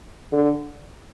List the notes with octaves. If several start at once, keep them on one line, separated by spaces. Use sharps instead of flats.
D3